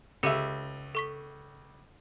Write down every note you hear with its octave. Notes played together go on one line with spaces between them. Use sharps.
C#2 G4 A4 E5 C#7
A4 C#6 B6